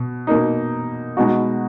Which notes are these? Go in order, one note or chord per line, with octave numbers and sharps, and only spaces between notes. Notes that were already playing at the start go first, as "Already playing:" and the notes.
Already playing: B2
B2 A#3 D#4
B2 G#3 B3 D#4 F#4